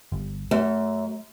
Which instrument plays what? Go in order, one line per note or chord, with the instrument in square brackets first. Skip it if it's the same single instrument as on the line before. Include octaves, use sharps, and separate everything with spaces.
[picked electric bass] G1
[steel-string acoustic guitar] F#2 [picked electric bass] A3